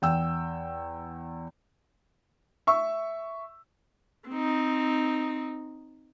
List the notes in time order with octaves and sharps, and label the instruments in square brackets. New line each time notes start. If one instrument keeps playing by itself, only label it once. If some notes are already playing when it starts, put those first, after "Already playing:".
[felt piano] E2 G5 E6
[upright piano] E5 C#6 E6
[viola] C4 D#4